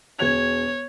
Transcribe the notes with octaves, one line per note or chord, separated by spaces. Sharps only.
E1 C#5 G#6 F7